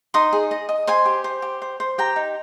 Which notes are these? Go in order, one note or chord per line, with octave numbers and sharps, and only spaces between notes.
D#4 C6 D#6
G#4
D#5
D#5
C5 G#5 C6
G4
C5
G4
C5
C5
G4 G5 A#5
D#4